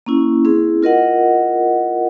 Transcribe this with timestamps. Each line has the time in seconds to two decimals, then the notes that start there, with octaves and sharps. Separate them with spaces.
0.06 A#3 C#4 E4
0.45 C4 E4 G#4
0.83 F4 A#4 D#5 F#5